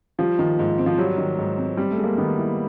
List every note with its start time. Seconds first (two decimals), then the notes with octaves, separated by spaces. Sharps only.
0.19 F3 G3
0.39 D#3
0.59 G#2
0.78 C4
0.86 F3
0.98 F#3 G3
1.18 D#3
1.38 G#2
1.58 C4
1.77 G3 C4
1.91 A3
1.98 G#3
2.04 A#3
2.18 D#3 B3
2.38 E4